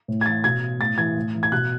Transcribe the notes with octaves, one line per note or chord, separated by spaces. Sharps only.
A2
G#6
E3 A6
B2 G#6
A2 A6
E3 G#6
A2
E3
G#6
B2 F#6